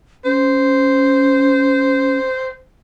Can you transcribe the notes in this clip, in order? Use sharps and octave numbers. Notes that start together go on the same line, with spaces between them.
C#4 C5